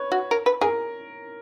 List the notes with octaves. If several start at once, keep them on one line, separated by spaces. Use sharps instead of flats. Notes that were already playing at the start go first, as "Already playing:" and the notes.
Already playing: B4 C#5
F#4
A#4
B4
G#4 A#4